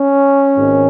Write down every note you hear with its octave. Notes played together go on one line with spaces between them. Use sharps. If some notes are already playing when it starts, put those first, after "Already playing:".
Already playing: C#4
G#1 G#2 D#3